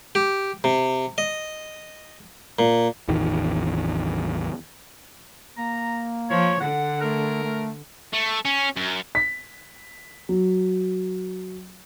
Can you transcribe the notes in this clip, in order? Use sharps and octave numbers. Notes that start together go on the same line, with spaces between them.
G4
C3
D#5
A#2
A1 E2 D#3
A#3 A#5
F3 C#5
D3 F#5
A3 A#4
A3
A3
C#4
F#2
B6
F#3